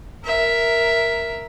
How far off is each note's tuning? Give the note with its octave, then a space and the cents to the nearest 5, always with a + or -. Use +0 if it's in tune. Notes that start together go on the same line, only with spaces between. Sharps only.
A#4 +0 E5 +0